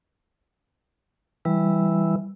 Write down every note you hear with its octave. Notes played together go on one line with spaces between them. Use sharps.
E3 G3